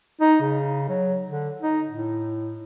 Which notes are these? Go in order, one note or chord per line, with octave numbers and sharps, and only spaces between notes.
D#4
C#3
F#3
D3
D#4
A2